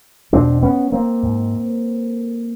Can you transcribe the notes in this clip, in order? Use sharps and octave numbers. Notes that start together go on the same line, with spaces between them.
E2 B2 C4 D4
B3 C#4
A#3 C4
G#2